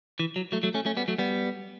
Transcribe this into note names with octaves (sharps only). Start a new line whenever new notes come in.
E3
F#3
F#3 A3
F#3 A3
A3 C#4
A3 C#4
G3 B3
F#3 A3
G3 B3